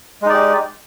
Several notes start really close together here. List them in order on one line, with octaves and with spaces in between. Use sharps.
G#3 D#4 D5 G4